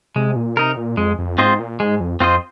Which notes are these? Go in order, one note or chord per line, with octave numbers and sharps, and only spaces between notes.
C3 G#3
A#2
C3 D#4 A#4
A#2
F2 G#3
F2
G#2 C4 F4 C5 D#5
A#2
G#2 G#3
F2
F2 C4 F4 C5 D#5